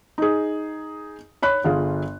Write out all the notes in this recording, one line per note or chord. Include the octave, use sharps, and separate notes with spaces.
D#4 G#4
C#5 B5 F#6
G1 F4 G#4